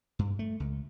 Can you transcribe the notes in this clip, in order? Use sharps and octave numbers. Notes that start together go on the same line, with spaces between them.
G2
A3
C#2